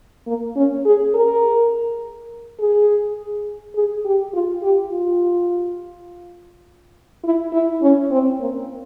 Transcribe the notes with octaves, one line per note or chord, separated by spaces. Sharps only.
A#3
C#4
G#4
A#4
G#4
G#4
G4
F4
G4
F4
E4
E4
C#4
C4
A#3